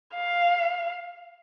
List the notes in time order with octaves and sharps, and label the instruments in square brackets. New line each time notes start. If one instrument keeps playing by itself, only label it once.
[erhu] F5